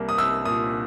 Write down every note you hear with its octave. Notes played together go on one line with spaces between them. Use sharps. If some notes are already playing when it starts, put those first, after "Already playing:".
Already playing: C2 G3 A#3
D#6
C2 E6
A#2 D#6